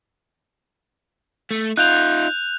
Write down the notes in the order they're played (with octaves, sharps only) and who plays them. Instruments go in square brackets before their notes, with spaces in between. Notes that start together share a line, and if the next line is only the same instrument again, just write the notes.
[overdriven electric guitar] A3
[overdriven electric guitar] D#4 F4 [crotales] F#6 G6 F7